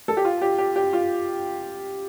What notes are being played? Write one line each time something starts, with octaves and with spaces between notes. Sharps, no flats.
A4
G4
F4
G4
G4
G4
F4